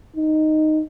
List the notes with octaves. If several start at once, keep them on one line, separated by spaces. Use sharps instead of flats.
D#4